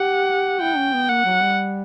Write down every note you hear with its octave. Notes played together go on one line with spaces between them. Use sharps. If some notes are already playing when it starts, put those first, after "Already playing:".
Already playing: G4 F#5
E4 G5
C#4
B3
A#3 F#5
F#3
G3